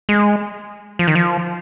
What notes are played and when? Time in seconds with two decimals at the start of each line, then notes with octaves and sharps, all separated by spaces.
0.09 G#3
0.99 F3
1.08 D#3
1.15 F3